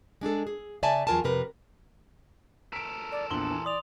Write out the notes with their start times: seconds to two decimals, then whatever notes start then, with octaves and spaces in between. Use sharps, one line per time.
0.21 G#3 D4 G#4 A4
0.47 G#4
0.83 C#3 D5 E5 G#5 A5
1.07 E2 F#3 F4 A#4 G#5 A5
1.24 F2 C3 A#4 B4
2.73 A4 A#4 B6 D7
3.12 D5
3.31 A#1 E2 D4 C6 G7
3.50 E3
3.65 D5 C6 D#6 F7